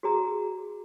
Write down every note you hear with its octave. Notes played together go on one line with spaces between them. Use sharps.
F#4 G#4 A#5